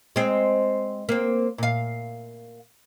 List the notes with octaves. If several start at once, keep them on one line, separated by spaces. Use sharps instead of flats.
G#3 C4
A#3 C4
A#2 F5